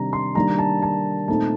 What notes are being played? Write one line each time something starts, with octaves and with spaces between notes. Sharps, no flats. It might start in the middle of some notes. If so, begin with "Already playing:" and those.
Already playing: C3 D#3 G3 D4 A#5
C6
D#3 G3 A#3 D4 A#5
A5
A5
A#2 A3 C4 D#4 A5